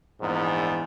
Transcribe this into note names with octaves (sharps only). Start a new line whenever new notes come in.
A#1 E2 G#2